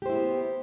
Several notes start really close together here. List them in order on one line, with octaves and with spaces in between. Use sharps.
G4 C5 E4 B3